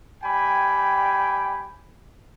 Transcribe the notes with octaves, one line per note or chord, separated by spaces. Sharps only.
G3 G5 G#5 B5